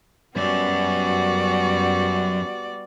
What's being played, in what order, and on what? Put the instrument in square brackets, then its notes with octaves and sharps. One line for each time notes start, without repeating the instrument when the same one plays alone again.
[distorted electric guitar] F#2 [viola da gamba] G3 B3 F#4 [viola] D5